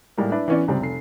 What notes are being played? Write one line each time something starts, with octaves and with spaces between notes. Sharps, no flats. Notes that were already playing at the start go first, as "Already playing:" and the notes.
A2 G3 G#3 A#3
D4 E4 B4
E3 B3 C#4 C#5 D5
C#2 F#2 C3 G3 C4
F1 C7